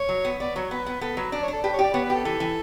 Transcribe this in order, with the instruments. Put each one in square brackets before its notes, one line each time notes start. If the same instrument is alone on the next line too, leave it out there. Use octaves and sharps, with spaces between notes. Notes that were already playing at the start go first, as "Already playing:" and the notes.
Already playing: [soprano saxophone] C#5
[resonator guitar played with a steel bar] F#3
B3
[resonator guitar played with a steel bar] B3 [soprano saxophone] D5
[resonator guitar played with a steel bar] F#3 [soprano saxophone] C#5
[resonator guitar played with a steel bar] B3 [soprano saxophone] B4
[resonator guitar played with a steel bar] B3
[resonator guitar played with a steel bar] B3 [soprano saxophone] A4
[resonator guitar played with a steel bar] F#3 [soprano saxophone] B4
[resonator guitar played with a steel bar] D4 [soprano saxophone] D5
[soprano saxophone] C#5
[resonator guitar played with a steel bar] D4
[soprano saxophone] A4
[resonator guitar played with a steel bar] G4 [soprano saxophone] B4
[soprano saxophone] C#5
[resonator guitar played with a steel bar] G4 [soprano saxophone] D5
[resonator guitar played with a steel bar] B3 [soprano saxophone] C#5
[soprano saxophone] B4
[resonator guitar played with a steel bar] G4 [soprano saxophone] A4
[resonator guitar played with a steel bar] E3 [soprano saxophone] A4
[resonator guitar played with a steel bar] E3